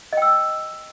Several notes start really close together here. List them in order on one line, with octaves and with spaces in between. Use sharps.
D#5 G5 E6